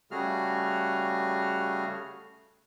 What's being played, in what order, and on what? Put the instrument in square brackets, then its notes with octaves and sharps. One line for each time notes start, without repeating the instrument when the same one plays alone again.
[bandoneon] C#3 G3 A3 F#4 G#4 F6